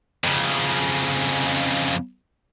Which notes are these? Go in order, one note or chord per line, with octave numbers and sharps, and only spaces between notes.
F2 C#3